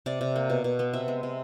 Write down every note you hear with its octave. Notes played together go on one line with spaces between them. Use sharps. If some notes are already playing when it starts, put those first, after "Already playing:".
C3 D5
C3
A#3
B2
B2
B3
C3 E5
G#3
C3